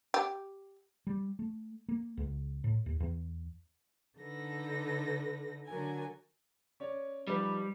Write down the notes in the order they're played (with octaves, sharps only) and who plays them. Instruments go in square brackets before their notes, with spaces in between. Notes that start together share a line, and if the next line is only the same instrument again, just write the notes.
[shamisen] G4
[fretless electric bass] G3
A3
A#3
C#2
A2
D#2
E2
[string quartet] D3 D#4 A4 B4 A#6
D3 F#3 A#4 G#5
[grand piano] C#4 C#5 D5
[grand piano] F3 D#4 B4 [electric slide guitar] G3